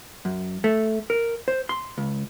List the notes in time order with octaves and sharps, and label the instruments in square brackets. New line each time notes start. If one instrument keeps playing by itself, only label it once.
[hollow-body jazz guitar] F#2
A3
A#4
C5
C6
C#2